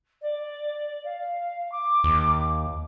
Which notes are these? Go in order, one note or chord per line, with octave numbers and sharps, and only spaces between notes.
D5
F5
D6
D#2